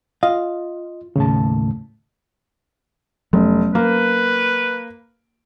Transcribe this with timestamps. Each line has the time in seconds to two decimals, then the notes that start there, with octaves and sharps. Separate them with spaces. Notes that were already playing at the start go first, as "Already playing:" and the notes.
0.23 F4 D#5 F5
1.16 D#2 A2 C#3 A5
3.33 F1 F#3 B3 C#4
3.75 A#3 B4